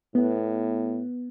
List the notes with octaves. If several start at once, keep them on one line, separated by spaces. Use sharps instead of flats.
A2 B3